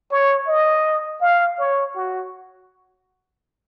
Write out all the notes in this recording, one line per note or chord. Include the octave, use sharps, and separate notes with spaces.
C#5
D#5
F5
C#5
F#4